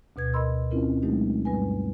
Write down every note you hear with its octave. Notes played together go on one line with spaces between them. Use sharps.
D2 B2 B4 G#6
A#4 D#5 B5 C6 E6
C4 C#4 E4 F4 A#4
F#3 G#3 A3 D#4 G4
G2 G3 B4 G#5